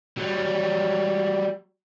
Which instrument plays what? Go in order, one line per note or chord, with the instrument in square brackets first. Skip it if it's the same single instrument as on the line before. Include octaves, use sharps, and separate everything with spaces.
[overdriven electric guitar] F#3 G3